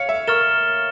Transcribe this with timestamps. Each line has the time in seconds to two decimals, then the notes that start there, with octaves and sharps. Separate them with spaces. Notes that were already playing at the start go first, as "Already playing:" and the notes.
Already playing: C#5 F5 C#7
0.09 E5
0.27 A#4 C#6 F6 A6 E7 G7